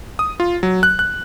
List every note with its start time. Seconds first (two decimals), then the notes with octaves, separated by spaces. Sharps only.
0.19 D#6
0.40 F4
0.63 F#3
0.83 F#6
0.99 F#6